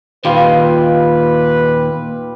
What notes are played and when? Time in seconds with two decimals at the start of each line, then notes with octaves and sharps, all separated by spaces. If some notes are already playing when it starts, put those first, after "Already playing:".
0.25 D#2 A#2 D#3 G3 F4 B4 B5